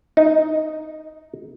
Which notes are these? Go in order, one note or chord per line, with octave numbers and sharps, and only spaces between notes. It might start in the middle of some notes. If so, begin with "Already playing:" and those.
D#4